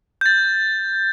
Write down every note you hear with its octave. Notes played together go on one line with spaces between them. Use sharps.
G6 A6